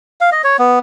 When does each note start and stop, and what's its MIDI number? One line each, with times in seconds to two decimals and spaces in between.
0.21 0.30 77
0.32 0.42 75
0.44 0.57 73
0.59 0.79 59